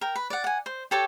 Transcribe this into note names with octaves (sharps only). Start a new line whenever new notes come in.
A#4 G5
B4
D5 F#5
F#5 G#5
C5
G4 A4 C#5